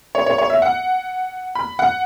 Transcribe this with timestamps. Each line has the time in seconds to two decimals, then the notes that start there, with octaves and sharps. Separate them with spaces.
0.15 C#5
0.26 C#5
0.38 C#5
0.50 E5
0.62 F#5
1.55 B5
1.79 F#5